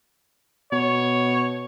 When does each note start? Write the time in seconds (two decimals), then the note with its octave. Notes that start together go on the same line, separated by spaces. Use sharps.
0.72 B2 C#5